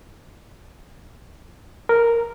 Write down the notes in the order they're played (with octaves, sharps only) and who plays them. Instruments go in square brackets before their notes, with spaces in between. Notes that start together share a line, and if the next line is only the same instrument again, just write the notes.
[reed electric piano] A#4